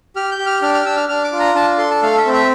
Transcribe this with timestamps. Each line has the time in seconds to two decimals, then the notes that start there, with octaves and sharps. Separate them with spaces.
0.16 G4 F6
0.32 G6
0.39 G4
0.46 F6
0.62 D4 F6
0.74 F6
0.86 D4 E6
0.97 F6
1.09 D4 F6
1.24 D6
1.32 F4
1.40 A#5
1.55 D4 A5
1.78 A4 C6
1.90 A5
2.02 A3 F5
2.18 E5
2.26 C4
2.33 E5